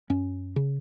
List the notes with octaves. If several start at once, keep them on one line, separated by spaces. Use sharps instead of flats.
F#2 C#4
C#3